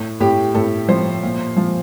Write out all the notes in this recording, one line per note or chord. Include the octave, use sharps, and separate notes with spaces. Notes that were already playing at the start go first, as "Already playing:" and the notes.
Already playing: A2
A2 G4
A2 A4
F3 C5
A#2
F3